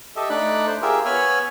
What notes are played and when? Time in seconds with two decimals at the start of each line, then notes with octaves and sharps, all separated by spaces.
0.16 G4 A4 D#5 E5
0.30 A3 D4 D#4 D5 B5 F#6
0.67 C5
0.82 F4 G4 G#4 A#4 E5
1.05 B3 C#5 G#5 B5 E6 F6